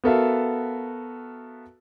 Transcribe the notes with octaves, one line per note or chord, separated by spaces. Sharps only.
B3 F#4 A4 A#4 E5 F5